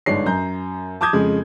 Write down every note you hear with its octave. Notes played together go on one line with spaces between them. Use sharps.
G1 G#2 D4 C#5 C7
F#2 A#5 G6
A5 D6 D#6 G6 G#6
F2 C#3 G#3